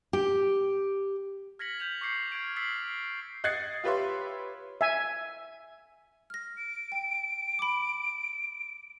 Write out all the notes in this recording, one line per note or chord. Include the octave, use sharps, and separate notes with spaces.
G4
F6 G#6 A#6 B6 C#7 F#7
G6 B6 F7 F#7
C#6 D6 G6 C7 C#7
F6 G#6 C7 D7
E6 F6 A6 B6 C7 F#7
D#5 F#6 G#6 A6 C7 C#7
F4 G4 B4 C#5 E5 C6
E5 G#5
F6 A#6
D7
G5
B5 D6